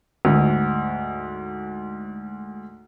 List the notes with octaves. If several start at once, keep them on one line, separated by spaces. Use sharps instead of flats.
D2 G#2